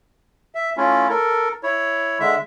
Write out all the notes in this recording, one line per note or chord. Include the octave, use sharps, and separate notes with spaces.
E5
A3 C#4 E4 F4
A4 A#4
E4 C#5
D3 G#3 E5